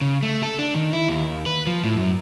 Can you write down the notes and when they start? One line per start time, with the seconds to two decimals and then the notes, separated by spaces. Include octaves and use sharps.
0.01 C#3
0.23 A3
0.43 A4
0.59 D4
0.75 D#3
0.93 E4
1.08 D#2
1.46 B4
1.67 F3
1.84 A2
1.97 F#2